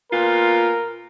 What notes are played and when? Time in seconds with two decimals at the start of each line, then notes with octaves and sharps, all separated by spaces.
0.12 A#2 B3 F4 A#4